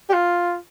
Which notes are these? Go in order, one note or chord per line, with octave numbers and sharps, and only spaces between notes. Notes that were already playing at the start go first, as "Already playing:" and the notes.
G4
F4